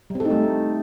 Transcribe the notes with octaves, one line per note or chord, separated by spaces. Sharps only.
G3
C4
A4
D#4
A3